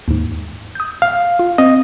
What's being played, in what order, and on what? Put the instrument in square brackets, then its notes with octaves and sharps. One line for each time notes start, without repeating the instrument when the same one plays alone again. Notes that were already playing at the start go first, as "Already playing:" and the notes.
[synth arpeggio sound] D#2 G#2
D#6 G6
[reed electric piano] F5
[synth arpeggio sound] F4
[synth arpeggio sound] C4 [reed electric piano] D#5